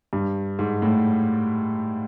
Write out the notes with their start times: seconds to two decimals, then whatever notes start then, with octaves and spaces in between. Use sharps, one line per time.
0.13 G2
0.59 G#2
0.82 A2